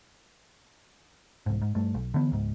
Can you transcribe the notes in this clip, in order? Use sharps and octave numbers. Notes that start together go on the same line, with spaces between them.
C2 G#2
G#2
G2 A3
B1
D3 E3 B3
C#2 G#2